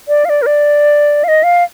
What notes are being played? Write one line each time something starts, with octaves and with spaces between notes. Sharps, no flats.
D5
F5
D5
A#4
D5
F5
D#5
F5